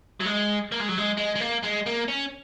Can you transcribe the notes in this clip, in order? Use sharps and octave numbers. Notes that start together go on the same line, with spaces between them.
F#3
G#3
A#3
G#3
F#3
G#3
G#3
G#3
A#3
G#3
A#3
C#4